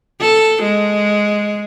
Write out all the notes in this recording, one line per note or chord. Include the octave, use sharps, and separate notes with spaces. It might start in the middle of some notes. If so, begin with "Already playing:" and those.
A4
G#3